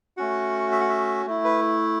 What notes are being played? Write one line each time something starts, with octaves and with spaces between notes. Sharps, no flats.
A3 C#4 F#4 F#5
E5
F#5
E5
A3 E4
B4